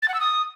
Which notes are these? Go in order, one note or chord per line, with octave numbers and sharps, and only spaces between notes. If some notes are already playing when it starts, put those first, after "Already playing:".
A6
F#5
E6
D#6